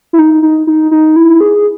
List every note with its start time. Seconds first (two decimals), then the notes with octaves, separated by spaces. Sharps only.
0.13 E4
0.19 D#4
0.43 D#4
0.67 D#4
0.91 D#4
1.16 E4
1.41 G#4